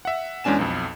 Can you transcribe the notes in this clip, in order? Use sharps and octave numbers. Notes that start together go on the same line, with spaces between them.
E5 F#5
E2 G#3 C#4 D4 G#5 E7
B1 F2